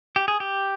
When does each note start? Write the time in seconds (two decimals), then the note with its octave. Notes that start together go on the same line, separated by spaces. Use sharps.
0.16 G4
0.28 G#4
0.40 G4